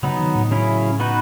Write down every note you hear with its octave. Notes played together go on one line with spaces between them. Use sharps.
C#3 F#3 B3 D#4
D#3
A2
C#3 F#3 C#4 E4
B3 D#4 F#4 B4